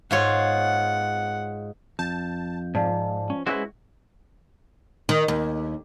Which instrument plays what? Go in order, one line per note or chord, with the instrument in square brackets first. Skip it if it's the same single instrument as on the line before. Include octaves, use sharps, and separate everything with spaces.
[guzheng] G#2 F4 C#5 [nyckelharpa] F#5
[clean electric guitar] F2 [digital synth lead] A5 [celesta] G6
[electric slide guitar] G#2 [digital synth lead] F3 [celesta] D5 F5 A5
[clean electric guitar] C#4
[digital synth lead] G#3 [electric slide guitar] C#4 E4 F#4 [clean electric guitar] B4 C5
[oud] D#3
D#2